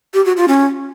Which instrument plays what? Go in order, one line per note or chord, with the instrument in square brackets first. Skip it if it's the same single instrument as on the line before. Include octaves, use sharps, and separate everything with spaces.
[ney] G4
F#4
F4
C#4